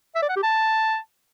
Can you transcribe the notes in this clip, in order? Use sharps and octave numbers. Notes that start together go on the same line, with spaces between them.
E5
D5
F#5
G4
A5